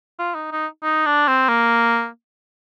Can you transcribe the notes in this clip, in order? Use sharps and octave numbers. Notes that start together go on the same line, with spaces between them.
F4
D#4
D#4
D#4
D4
C4
A#3